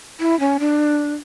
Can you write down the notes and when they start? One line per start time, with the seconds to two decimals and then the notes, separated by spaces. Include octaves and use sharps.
0.20 E4
0.40 C#4
0.60 D4